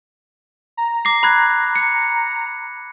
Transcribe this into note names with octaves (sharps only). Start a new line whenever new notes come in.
A#5
D6 A#6 C7
B5 F#6 G#6
C#7